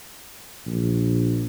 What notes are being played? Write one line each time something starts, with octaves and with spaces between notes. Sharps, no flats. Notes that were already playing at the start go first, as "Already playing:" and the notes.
A#1